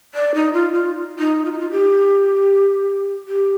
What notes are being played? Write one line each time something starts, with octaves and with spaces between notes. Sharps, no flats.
D5
D#4
F4
F4
D#4
F4
D#4
F4
G4
G4